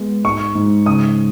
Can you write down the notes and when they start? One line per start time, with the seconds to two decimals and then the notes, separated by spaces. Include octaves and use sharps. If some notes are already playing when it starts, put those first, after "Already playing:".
Already playing: G#3 B3
0.24 G#2 C#6
0.55 G#2
0.86 C#3 D#6